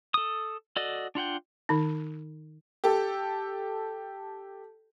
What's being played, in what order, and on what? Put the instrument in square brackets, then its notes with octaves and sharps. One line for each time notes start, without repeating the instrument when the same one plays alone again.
[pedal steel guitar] A4 D#6
F#4 A4 D5 D#5
D4 F4 F#5 G5
[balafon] D#3 D#4
[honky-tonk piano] G4 A4